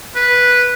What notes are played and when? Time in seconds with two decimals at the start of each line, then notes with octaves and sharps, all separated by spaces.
0.15 B4